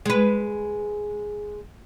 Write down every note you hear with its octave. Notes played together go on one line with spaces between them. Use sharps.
G#3 B4